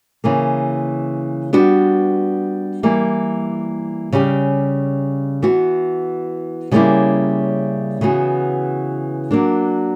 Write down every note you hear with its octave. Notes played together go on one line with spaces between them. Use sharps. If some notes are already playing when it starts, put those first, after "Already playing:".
C#3 E3 A#3
G3 B3 D4 F#4
E3 G3 A#3
C#3 G3 C#4 G4
E3 B3 F#4
C#3 G3 A#3 C#4 E4
C#3 E3 B3 F#4
F#3 A#3 D4